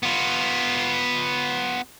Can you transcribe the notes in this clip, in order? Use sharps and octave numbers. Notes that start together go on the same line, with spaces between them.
B3 F4